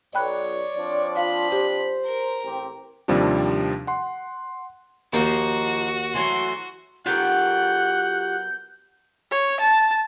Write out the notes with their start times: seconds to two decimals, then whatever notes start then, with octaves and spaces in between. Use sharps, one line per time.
0.15 B1 C#5 D5 G5 B5 F#6
0.77 F3 C4 D4
1.17 F4 F5 B5
1.52 G4 C5
2.05 A#4
2.44 A1 C4 G4
3.08 D#2 C3 F3 G3 C4 D4
3.87 F#5 C6
5.13 D#2 F3 A#3 D#4 F#4
6.15 E3 F#3 A3 C6
7.06 F#3 B3 F4 G4 A#4 F#5 G6
9.32 C#5
9.61 A5